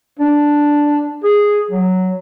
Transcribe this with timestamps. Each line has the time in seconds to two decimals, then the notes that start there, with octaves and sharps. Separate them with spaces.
0.19 D4
1.23 G#4
1.71 F#3